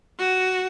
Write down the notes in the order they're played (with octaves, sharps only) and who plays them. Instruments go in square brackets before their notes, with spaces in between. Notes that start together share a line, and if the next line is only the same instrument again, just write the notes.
[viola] F#4